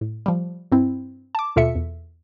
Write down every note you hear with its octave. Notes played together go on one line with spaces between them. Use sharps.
A2
F3 G3
G2 C4 E4
A5 D6
D#2 B2 F4 A4 E5 C#7
E2